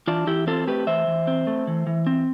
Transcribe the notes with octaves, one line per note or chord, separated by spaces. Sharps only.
E3 D4 F4
E3 E4 G4
C4 F4 A4
A3 G4 B4
E3 C5 E5
E3
C4
A3
E3
E3
C4